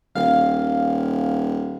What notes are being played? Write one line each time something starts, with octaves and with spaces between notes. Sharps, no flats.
D#1 F5